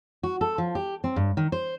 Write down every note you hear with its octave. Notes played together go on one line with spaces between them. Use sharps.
F#4
A4
F3
G4
C4
G2
D#3
C5